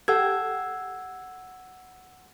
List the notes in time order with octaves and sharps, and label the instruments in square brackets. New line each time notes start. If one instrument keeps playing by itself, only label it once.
[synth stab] G4 A4 G5 [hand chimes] F#5 E6 G#6